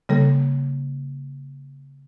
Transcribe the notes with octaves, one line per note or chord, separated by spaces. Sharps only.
C#3 G3 A#3 A4